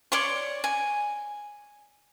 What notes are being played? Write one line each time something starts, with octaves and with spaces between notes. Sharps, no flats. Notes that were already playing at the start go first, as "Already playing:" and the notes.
C#5 D5 C6 C#6
G#5